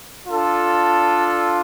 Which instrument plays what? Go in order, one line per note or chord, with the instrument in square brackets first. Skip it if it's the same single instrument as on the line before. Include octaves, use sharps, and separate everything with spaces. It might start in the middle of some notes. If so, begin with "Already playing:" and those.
[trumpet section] D4 F4 A4